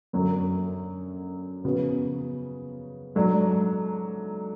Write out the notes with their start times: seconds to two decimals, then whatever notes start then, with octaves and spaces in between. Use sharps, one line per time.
0.13 F#2 D3 F#3
1.64 C#3 F3 B3 F#4 B4
3.15 G#2 F#3 A3 D4